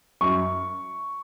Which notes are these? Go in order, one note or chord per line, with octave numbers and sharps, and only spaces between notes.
F#2 C#6